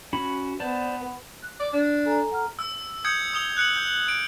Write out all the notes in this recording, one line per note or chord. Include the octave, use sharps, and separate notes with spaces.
C#4 F#4 B5
B3 C5 D5 A5
F#6
D5
D4
A4 G#5 A#5
F#5 A#5 F6
E6
D#6 G6 G#6 C#7
D#6 F7 G7
F#6 C#7 F#7
G6
D7